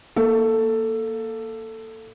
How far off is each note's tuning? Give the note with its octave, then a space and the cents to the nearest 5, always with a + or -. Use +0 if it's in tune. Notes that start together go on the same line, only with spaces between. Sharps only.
A#3 +0 A4 +10